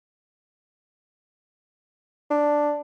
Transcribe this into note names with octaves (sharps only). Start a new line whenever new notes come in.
D4